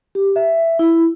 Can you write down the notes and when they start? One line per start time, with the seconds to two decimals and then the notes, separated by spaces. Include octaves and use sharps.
0.15 G4
0.36 E5
0.79 E4